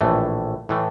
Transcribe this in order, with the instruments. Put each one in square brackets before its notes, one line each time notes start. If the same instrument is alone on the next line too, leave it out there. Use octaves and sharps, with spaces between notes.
[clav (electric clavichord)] A#1 A2 E3 A3
A2 E3 A3